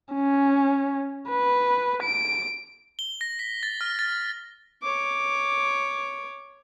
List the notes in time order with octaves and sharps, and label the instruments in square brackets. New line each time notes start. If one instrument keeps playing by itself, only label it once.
[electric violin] C#4
B4
D7
[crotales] G7
A#6
B6
A6
F6
A6
[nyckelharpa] C#5 D6